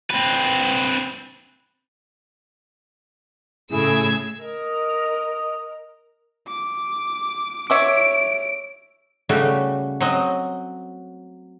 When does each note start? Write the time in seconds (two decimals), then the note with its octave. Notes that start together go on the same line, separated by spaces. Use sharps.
0.11 C4 B4
3.71 A2 C#3 A3 E4 G#4 E6 G#6
4.41 A#4 D#5
6.48 D6
7.70 C#5 E5 D6 D7
9.29 C#3 G3 A3 F#4 A4
10.00 F#3 C4 D#5